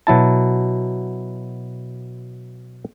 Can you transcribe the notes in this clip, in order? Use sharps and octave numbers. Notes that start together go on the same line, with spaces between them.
B2 F#3 E4 A5